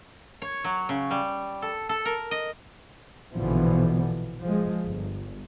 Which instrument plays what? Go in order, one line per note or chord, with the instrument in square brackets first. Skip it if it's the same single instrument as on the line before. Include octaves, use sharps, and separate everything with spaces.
[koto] C#5
F#3
C#3
G3
A4
A4
A#4
D#5
[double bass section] A#1 B2 D3 E3 F3 B3
F3 G#3
G1